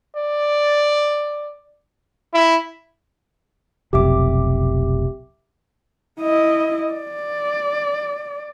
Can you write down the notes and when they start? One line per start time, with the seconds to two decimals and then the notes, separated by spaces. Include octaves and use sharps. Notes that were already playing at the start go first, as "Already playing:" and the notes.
0.17 D5
2.34 E4
3.93 F1 B1 F2 G4 E5 D6
6.21 E4 D#5
6.93 D5